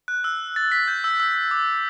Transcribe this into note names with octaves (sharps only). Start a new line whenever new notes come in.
F#6
E6
A6
B6
G6
E6
E6
D6